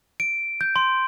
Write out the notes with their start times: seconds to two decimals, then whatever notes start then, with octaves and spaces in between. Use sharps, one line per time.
0.20 D7
0.61 G6
0.76 C6